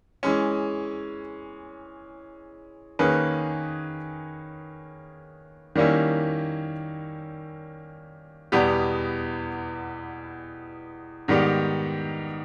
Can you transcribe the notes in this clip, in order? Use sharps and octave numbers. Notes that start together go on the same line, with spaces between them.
E3 G#3 C#4
D#3 A#3 C#4 G#4 B4
D#3 G3 A#3 C#4 E4
E2 B2 G3 B3 G4
G#2 D#3 G3 B3 G4